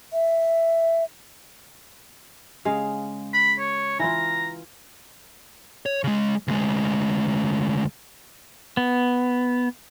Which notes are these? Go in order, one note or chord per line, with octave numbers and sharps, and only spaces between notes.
E5
C#3 G#3 F5
B5
C#5
E3 E4 F4 A#5
C#5
C#3 G#3
D2 G#3
B3